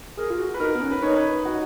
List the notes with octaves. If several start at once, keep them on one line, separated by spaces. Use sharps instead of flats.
G#4 A#4
F4
F#4
B4
D#4 A#4
B3
C#4
B4
D#4 C#5
B4
F#4